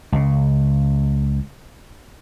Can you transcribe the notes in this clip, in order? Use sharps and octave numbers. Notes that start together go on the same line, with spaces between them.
C#2 C#3